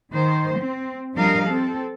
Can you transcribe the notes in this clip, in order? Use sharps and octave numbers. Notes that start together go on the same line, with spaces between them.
D#3 C5
C4
F3 G3 D4 A#4 D#5 F5
C4 A4